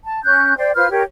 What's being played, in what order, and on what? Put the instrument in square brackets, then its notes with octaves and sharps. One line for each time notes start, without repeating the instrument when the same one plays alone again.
[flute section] A5
C#4 F#6 G6
C5 D5 G5
F4 B4 C5 F6
G4 A#4 C#5